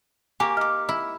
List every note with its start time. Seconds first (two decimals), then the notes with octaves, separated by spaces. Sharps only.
0.40 A#3 G4 G#5 C#6
0.57 D#4 D6 F6
0.89 E4